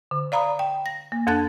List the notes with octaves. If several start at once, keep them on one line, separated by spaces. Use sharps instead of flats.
D3
D5 F5 A#5 B5 D#6
G5
A#6
A#3
F2 D4 A4 A5 F#6 A6